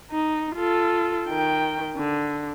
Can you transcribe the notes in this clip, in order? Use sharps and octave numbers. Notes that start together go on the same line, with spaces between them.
D#4
F4 A4
D#3 G5
D3